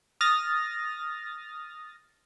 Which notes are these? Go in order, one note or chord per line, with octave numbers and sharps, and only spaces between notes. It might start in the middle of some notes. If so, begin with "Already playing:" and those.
D#6 F6 A6 A#6